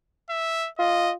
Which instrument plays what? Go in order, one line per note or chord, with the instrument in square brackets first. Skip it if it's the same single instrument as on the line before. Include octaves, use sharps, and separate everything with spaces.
[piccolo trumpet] E5
[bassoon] F4 [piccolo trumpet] D#5